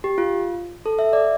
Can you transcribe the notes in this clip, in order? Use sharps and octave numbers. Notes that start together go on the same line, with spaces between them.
G4
F4
A4
E5
D5